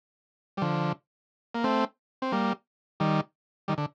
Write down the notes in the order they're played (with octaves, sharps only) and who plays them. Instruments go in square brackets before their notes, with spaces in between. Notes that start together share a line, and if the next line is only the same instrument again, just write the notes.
[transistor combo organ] G3
D3 F3
A#3
A3 C4
C4
G3 A#3
D#3 G3
D#3 G3
D3